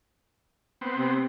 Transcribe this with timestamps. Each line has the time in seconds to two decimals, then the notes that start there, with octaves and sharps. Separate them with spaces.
0.81 B3 C4
0.98 C3